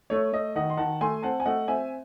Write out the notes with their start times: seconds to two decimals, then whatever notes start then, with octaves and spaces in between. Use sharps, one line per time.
0.10 A3 C#5
0.33 A3 D#5
0.56 D#3 D#5 F#5
0.70 C6
0.78 D#3 F#5 A5
1.01 A3 G#5 C6
1.23 C4 F#5 A5
1.40 G#5
1.45 A3 D#5 F#5
1.68 C4 E5 G#5